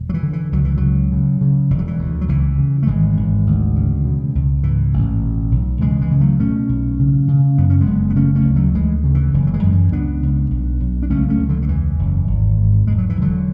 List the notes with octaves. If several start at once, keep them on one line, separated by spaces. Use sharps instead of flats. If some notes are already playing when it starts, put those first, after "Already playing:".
Already playing: E1
F#3
E3
D3
E3
C#2 F#3
E3
C#3 D3 F#3
C#3
C#3
E1 E3
F#3
E3
D2
F#3
C#2 E3
C#3
A3
G#1 E3 G#3
G#1
D2
C#3
B2
C#2
G#2 E3
A1
B2
B1
C#2 E3 G#3
E3 G#3
C#3
F#3 A3
B2 A3 C#4
B1
C#3
C#3
F#2 B3
C#4
G#3 B3
F#1
B3
C#3 A3 C#4
A3 C#4
D2
F#3 A3
D2 E3 G#3
C#3
E3
F#1 E3
F#3
E3 G#3
F#2
E3
C#2 B3 D4
C#2
B1
B1
D4
C#2 A3 C#4
A3 C#4
C#2
D3 F#3
D3
E2 E3
F#1
G#1
G#2
E1 G#3
F#3
E3
E1
D3 F#3